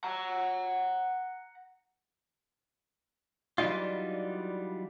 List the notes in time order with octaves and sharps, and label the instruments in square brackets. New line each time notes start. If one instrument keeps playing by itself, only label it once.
[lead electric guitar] F#5 A#5
[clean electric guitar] E3 F#3 G3 D4 D#4 F4